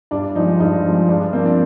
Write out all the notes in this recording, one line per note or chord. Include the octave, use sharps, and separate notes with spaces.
G2 D4
F3 G#3 D#4
G2 D#4
F3 G#3
G2 D4
D4
F3 A#3 C4
D4